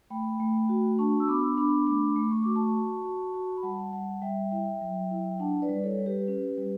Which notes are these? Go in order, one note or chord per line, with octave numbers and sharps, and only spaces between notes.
A3 G5 B5
A3
F#4
D4 A5 C#6
E6
B3 B5 D6
D4 B5 D6
A3 B5 D6
A3
C#6
F#4 D6
A5 C#6
F#4
F#4
F#4
B5
G3 F#5 A5
G3 F#5 A5
G3 E5 G5
E4 E5 G5
F#3
E4
G5
D4 F#5 A5
B4 D5
G3
A4 C#5
G3
G4 B4
C#4
G3